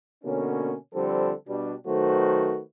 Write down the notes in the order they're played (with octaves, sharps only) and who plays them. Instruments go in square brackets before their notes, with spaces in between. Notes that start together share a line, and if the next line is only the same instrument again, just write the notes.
[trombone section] B2 D3 A#3 C#4
D3 F3 G3 C4 A4
B2 G3 D4
D#3 F#3 A3 F#4 B4 C5